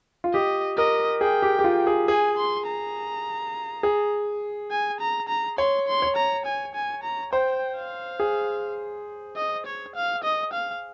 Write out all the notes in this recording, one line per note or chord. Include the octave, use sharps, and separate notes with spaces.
F4
G4 D#5
A#4 D#5
G#4 G5
G4
G4
F4
G#4
G#4 G#5
C6
A#5
G#4
G#5
A#5
A#5
C#5 C6
C6
C#5
A#5
G#5
G#5
A#5
C5 G5
F5
G#4
D#5
C#5
F5
D#5
F5